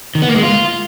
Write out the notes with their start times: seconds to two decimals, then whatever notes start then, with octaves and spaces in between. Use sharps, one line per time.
0.15 D#3
0.22 B3
0.29 A#3
0.36 G#3
0.43 F4